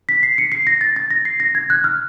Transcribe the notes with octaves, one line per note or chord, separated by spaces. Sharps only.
B6
C7
C#7
C7
A#6
A6
A6
A#6
C7
A#6
G#6
F#6
F6